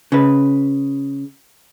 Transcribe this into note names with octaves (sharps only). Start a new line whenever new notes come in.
C#3 B4